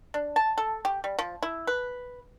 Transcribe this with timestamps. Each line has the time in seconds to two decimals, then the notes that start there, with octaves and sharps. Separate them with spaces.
0.14 D4
0.36 A5
0.58 A4
0.85 G4
1.04 G3
1.19 F3
1.43 E4
1.67 B4